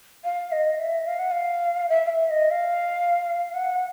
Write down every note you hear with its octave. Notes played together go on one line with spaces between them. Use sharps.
F5
D#5
E5
F5
F#5
F5
E5
F5
E5
D#5
F5
F#5